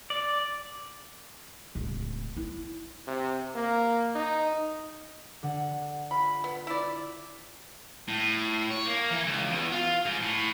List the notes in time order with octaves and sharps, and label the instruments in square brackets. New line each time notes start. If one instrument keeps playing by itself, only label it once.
[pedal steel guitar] D5
[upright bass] D1 C#2
E4
[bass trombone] C3
A#3
D#4
[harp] D3 F#5
[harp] F4 [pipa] B5
[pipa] B3
E4 D5
[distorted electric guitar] A2
C#5
A#3
E3
C#2
E2
F4
G#2
A2